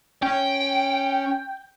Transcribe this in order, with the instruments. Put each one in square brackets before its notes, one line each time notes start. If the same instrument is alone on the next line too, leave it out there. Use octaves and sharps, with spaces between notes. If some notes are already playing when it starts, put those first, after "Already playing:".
[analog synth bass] C#4 [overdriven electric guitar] G5